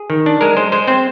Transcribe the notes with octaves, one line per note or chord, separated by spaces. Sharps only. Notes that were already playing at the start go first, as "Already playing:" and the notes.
Already playing: G#4
D#3
D4
G#3 A#4
G#3 C5
G#3 C5
C4 C5